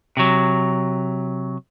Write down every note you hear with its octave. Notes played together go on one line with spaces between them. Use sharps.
C3 F#3